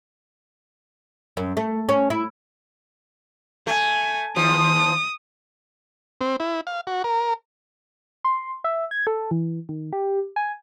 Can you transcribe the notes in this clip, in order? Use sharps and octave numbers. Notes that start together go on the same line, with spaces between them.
F#2
A3
C#4
E4
A3 G#5
D#2 F3 D#6
C4
E4
F5
F#4
A#4
C6
E5
G#6
A4
E3
D#3
G4
G#5